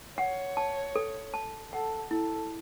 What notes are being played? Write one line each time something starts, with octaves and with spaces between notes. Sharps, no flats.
C#5 F#5
A5
A4
A5
A4 F#5
E4 A4